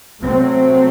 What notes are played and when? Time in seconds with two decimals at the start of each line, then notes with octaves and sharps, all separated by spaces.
0.22 C3 F#3 A3 C4